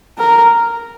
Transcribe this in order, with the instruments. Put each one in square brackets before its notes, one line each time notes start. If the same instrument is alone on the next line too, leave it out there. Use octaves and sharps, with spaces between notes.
[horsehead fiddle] A#4